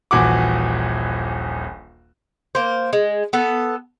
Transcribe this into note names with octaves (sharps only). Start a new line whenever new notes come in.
D#1 A#1 E3 F#4 F#5 D6
A#3 C5
G#3
B3 A4